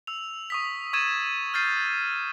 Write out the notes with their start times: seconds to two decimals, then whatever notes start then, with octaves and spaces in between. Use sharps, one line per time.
0.07 E6 F7
0.50 C#6 D#6 B6
0.93 C#6 E6 G#6 A6 D#7 E7
1.54 F6 G6 A6 C7 D#7